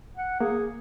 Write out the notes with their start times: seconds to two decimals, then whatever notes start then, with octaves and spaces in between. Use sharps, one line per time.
0.17 F#5
0.40 A#3 G#4